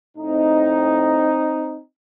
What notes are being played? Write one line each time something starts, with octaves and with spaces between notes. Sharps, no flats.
A2 C4 D#4